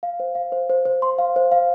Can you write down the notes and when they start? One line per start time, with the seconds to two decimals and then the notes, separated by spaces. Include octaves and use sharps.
0.03 F5
0.20 C5
0.35 F5
0.52 C5
0.70 C5
0.85 C5
1.02 C6
1.18 F5
1.36 C5
1.52 F5